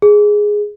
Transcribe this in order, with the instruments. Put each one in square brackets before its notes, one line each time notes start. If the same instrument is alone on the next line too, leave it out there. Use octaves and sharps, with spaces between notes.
[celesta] G#4